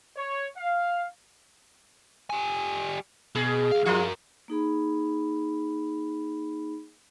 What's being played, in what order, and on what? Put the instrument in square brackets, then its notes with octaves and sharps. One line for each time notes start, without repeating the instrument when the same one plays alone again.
[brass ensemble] C#5
F5
[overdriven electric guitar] G3 G#5
[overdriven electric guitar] B2 [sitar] G#4
[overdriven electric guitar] D2 F5
[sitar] F3 F4 [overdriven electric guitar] F#4 A#4
[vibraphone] A#3 D#4 G#4 B5